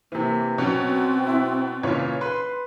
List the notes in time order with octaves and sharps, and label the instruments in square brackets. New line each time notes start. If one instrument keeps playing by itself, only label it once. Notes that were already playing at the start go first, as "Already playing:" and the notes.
[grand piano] C3 E3 [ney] A#3
[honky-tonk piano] B2 F#3 [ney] C4 [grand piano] C#4
[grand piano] E4
[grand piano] A#2 C#3 E3 [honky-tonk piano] C#5
[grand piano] B4 [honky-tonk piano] C6